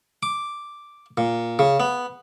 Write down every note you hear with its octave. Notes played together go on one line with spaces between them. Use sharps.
D6
A#2
C#3
B3